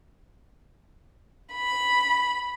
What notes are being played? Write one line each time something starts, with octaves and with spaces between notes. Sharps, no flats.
B5